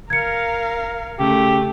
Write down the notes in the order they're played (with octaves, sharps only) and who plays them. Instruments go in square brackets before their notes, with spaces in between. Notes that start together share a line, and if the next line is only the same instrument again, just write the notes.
[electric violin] A#4 F5 [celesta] G#6 C#7
[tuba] C#3 [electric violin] A3 [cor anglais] G4